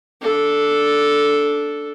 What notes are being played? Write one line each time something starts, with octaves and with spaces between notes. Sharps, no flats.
D4 A4